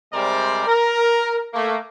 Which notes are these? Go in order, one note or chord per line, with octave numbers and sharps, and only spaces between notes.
C3 G3 G#3 A#4 C5 D5
A#4
A3 A#3